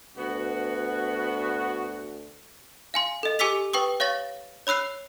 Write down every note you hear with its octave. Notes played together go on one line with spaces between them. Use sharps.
D2 B3 F#4
F5 G#5 C6
A4 D#5
G4 G#5 D6 E6 B6 F7
B4 G5 C#6 D#6
C#5 F5 C#6 A6 A#6
C#5 B5 E6 F#6 C7